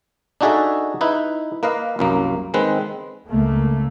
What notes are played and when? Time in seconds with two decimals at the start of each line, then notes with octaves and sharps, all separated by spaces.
0.41 D4 D#4 F#4 G#4 A4 E5
1.01 D#4 E4 B4
1.63 A#3 B4 D#5 F5
1.99 C2 F#2 A#3
2.54 D#3 G#3 C4 B4
3.29 C#2 A3 A#3